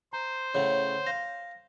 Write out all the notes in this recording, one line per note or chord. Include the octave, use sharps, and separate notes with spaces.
C5 A#5
A2 C#3 C#5 F#5
F5 A#6